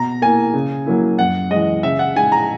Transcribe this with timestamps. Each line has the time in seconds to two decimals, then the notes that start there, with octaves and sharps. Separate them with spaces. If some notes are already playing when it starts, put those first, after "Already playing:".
Already playing: B2 A#5
0.22 A#3 E4 G#5
0.53 C#3
0.86 F#3 A#3 E4
1.19 F#2 F#5
1.51 E3 G#3 D#5
1.83 C#3 E5
1.99 F#5
2.16 G#3 D#4 G#5
2.32 A#5